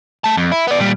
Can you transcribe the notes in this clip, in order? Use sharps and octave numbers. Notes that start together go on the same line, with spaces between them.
A3 A5
F2
E4
B3 D5
A#2 G3